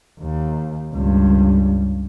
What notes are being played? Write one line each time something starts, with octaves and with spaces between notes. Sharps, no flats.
D#2
C#2 G2